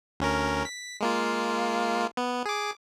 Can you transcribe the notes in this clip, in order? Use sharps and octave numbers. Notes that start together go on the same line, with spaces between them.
D2 C#4 A#4
B6
G#3 A#3 F4
B3
G#4 D6